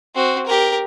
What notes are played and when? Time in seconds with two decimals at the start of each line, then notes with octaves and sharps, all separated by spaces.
0.15 C4 F#4
0.47 G4 A#4